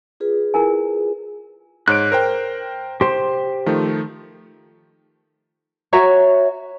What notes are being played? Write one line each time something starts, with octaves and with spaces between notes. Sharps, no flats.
F4 G#4 B4
E4 A#4 G#5
G#2 C#5 F#6 D7
A#4 C5 G5
G4 C5 C6
D#3 F3 A3
F#4 C#5 E5 A#5